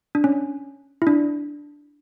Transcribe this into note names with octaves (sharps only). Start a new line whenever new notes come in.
D4
C#4
E4
D4